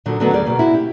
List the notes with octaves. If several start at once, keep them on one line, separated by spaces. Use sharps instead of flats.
A#2 D3 F3 F#3
D3 D#3 F#3 A3 B3 D4
D#2 G3 G#4 D5
B2 G3 A#3
E4 F#4
G4